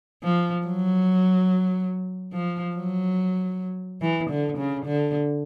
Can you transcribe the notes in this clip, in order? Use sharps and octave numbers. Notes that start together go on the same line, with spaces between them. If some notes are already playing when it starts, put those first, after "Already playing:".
F3
F#3
F3
F#3
E3
D3
C#3
D3